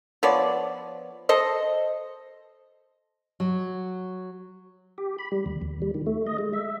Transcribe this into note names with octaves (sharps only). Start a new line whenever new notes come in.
F3 B3 C#5 D5
A4 C5 D#5
F#3
G4
B5
G3
D#2
D#2
G3
D#3
A3
D#5
G#3
E5